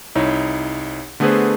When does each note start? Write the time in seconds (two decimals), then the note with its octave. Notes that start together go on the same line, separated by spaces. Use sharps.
0.15 C2 D#4 E4 C#5
1.20 D3 A3 B3 G#4 B4 C5